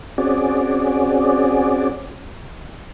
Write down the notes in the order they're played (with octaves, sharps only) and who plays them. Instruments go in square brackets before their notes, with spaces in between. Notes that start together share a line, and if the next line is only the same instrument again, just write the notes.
[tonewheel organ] C4 C#4 F#4 G#4 D5